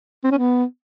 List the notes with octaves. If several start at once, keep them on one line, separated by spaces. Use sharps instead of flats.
C4
C#4
B3